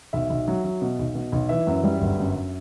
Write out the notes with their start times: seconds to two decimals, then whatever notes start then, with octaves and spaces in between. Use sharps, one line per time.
0.13 B1 E5
0.30 B1
0.48 F#3
0.64 F#3
0.82 B2
0.99 B1
1.15 B2
1.32 B1
1.49 E3 E5
1.67 F#2
1.84 G3
2.01 G1
2.18 F#2